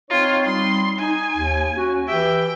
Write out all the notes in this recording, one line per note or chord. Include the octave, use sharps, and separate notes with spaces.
C4 D#4 F4 C#5
G3 C4 D#4 C6
D#4 G#5
D#2
C#4 F#4
E3 G4 E5 G5